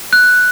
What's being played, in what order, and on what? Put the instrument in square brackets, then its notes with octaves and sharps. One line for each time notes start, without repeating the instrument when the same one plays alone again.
[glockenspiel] F#6